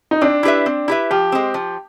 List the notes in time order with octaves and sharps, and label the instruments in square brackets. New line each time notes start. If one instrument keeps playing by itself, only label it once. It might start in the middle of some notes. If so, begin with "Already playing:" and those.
[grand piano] D#4
[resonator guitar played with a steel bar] C4 [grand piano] D4
[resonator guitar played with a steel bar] E4 G4 B4 E5
C4
E4 G4 B4 E5
[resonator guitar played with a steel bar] F3 [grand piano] G4
[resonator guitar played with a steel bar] G#3 C4
F3